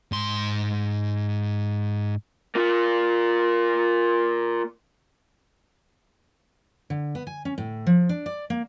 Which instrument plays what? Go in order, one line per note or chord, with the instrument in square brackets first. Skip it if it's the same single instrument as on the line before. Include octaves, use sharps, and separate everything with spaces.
[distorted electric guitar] G#2 C6
[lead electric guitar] A#3 F4
[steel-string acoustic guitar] D3
B3
G#5
C#4
A2
F3
D4
D5
A#3